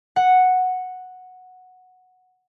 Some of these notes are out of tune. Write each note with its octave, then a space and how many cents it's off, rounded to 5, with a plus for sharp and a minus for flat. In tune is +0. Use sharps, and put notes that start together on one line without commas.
F#5 -5